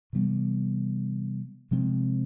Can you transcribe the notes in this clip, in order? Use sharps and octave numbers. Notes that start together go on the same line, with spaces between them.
C3 E3 G3 B3
C3 F3 G#3 C4